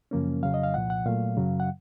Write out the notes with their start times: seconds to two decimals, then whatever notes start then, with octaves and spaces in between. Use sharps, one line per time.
0.11 F#2 C#3 F3 A#3 C#4
0.43 F2 C#3 F#3 F5
0.54 D#5
0.63 F5
0.74 C2 A#2 F3 F#5
0.90 F#5
1.05 A#2 F#3 A3 F5
1.37 F#2 C#3 F#3
1.60 F#5